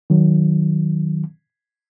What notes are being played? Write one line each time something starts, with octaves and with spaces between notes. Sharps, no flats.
D#3 F#3